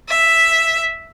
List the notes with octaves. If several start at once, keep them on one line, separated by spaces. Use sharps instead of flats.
E5